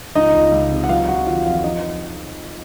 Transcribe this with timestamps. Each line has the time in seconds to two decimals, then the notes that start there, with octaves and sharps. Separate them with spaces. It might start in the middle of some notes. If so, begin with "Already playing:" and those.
0.15 C#2 D#4 D#5
0.34 C#2
0.52 C#2
0.71 C3
0.84 F#5
0.89 F#3 F4 F5
1.08 F#3 F#4 F#5
1.26 D#3 F4 F5
1.45 F2 F4 F5
1.64 F3 D#4 D#5